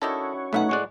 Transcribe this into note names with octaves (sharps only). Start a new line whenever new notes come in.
D#3 C#4 D4 E4 F#4 A4 C#5 D#5
B1 A3 B3 D#4 B4 E5 F#5
A2 G#3 D5 C#6 F#6